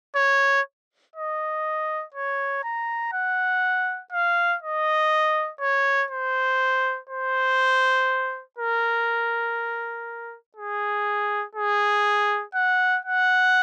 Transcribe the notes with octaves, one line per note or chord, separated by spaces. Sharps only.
C#5
D#5
C#5
A#5
F#5
F5
D#5
C#5
C5
C5
A#4
G#4
G#4
F#5
F#5